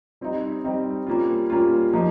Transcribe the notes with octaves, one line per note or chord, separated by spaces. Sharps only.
G3 C4 D#4
G3 C4 D#4
G3 A#3 C#4 F4
G3 A#3 C#4 F4
F3 A#3 D#4